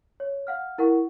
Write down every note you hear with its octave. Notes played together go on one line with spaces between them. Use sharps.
C#5
F5 F#5 F6
E4 A#4 F#5 C#6